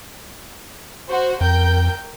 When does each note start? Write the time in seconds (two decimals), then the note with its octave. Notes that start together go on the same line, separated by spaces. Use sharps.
1.08 F#4 C5
1.41 F2 A#4 G5 G6